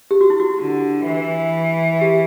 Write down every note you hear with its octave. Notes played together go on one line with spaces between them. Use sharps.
G4
F#4
E4
F#4
D3
E3
G4